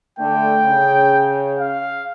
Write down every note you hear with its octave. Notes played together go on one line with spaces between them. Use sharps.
D3 A3 G5
C#3
F5